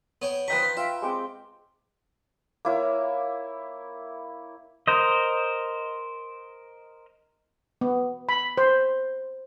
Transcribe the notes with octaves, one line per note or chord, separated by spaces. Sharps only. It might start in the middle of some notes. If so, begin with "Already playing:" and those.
B3 C#5 G5
F3 D#4 B4 G5 A#5 C#6 B6
F4
F4 E5 G5
G#3 C4 G5 D6
A#3 E4 C#5
A#4 C5 D#5
B3
B5
C5